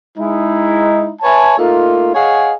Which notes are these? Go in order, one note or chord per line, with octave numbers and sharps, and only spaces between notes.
G#3 D#4 E4
B4 C#5 E5 G#5 A5
A3 A#3 D#4 F4
G#4 C#5 D#5 F5 F#5 G#5